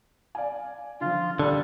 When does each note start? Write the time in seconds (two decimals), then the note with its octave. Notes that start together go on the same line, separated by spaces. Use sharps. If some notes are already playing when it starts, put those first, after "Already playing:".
0.35 D5 F5 G#5
1.01 D3 F3 F4
1.39 D3 G3 A5